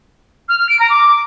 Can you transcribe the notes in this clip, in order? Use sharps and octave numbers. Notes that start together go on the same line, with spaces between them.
F6
F6
D7
A#5
D6